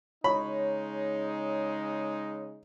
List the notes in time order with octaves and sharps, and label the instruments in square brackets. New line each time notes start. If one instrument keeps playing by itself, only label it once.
[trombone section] C#3 G#3 D#4 [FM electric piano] C#5 [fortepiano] B5